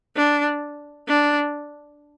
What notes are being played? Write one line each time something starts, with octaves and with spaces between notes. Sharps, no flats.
D4
D4